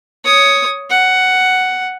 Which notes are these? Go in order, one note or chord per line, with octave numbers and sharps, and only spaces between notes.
C#5 D#6
F#5